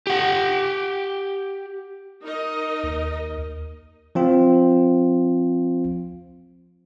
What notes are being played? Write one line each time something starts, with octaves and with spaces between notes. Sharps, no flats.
G4 F#5
D#4 A#4 D#5
D#2
F3 C4 F4